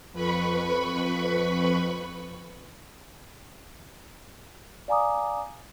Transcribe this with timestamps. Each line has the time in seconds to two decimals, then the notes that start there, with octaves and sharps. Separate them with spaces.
0.13 F2 B4 B5 C#6
4.88 D5 F5 G#5 A#5 D6 D#6